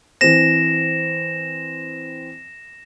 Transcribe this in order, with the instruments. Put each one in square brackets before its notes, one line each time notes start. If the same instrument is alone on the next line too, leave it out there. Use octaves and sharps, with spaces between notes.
[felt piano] E3 C4 [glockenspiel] A#6 E7